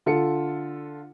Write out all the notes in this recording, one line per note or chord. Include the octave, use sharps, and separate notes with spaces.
D3 F4 A4 C#7